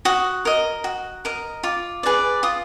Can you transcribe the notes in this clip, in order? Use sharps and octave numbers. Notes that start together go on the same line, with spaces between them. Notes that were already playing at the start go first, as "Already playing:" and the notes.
F#4 D#6
A#4 D#5
F#4
A#4 D#5
F4 D6
G#4 B4 D5
F4 D#6